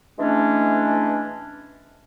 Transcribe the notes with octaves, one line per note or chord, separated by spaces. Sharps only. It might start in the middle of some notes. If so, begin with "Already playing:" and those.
E3 G#3 A3 C#4 D4